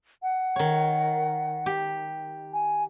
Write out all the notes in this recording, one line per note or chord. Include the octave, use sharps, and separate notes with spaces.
F#5
D#3 C#5
G4
G#5